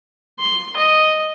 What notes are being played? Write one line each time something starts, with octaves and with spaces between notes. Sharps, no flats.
C6
D#5